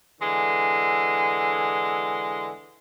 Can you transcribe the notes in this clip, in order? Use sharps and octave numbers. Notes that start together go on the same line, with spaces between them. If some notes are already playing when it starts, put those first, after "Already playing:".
D3 E3 G#3